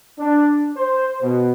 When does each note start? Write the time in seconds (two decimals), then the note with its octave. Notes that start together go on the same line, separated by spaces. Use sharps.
0.18 D4
0.75 C5
1.21 B2